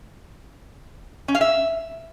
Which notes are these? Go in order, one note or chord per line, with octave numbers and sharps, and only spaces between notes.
C#4
F5
E5